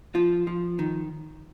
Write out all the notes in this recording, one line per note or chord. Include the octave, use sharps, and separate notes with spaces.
F3 F4
F3
D#3